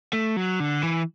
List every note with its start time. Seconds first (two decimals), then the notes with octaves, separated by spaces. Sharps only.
0.13 A3
0.37 F#3
0.60 D3
0.83 E3